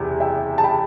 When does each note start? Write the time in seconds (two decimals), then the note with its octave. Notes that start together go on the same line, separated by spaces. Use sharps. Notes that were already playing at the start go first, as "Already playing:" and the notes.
Already playing: F#1 E2 C3
0.20 E5 G5
0.58 A5
0.64 G5 B5